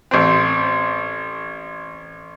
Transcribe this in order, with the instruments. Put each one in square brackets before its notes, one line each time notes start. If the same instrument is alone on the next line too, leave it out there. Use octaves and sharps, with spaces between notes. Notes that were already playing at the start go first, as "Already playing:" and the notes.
[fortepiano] A1 C4